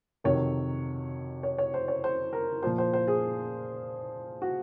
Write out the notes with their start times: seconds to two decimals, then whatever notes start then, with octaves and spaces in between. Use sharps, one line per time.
0.24 F2 C3 D#3 F#3 C#5
1.43 C#5
1.58 C#5
1.74 C5
1.88 C#5
2.04 C5
2.33 A#4
2.63 A#2 F3 C5
2.78 C5
2.93 C5
3.08 G#4
4.42 F#4